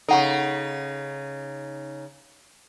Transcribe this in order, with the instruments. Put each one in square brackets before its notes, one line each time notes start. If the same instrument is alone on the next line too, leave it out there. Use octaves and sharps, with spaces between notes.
[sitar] C#3 D#4 [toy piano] A4 F#5 C#6